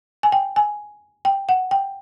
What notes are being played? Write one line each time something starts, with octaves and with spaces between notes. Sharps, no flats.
G#5
G5
G#5
G5
F#5
G5